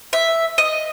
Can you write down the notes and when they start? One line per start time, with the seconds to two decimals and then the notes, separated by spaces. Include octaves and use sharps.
0.13 E5
0.58 D#5